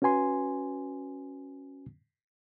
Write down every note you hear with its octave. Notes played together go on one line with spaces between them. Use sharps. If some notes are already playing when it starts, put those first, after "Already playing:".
C#4 F#4 B4 G#5 C6